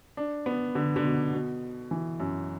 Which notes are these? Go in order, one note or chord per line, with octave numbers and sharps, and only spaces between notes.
D4
B3
D3
D3
B2
B2
E3
F#2